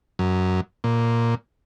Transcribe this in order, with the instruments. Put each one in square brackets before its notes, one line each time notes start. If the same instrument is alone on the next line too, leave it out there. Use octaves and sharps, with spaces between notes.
[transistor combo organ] F#2
A#2